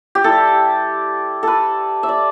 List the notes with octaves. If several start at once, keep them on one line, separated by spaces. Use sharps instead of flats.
G4
G3 E4 A4
A4 B4
E5
D5